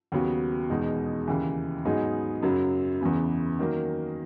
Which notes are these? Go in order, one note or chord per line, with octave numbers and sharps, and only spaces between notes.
D#2 C#3 F#3 B3 F#4
E2 B2 G#3 D#4
D#2 C#3 E3
G#2 F#3 B3 D#4 G#4
F#2 C#3 F#3
E2 C#3 E3 B3
D#3 F#3 A#3